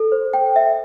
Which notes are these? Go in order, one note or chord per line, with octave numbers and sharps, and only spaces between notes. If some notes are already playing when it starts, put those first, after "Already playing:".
Already playing: A4
C5
G5
E5